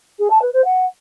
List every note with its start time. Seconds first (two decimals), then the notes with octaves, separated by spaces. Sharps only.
0.18 G#4
0.30 A5
0.41 B4
0.53 C5
0.64 F#5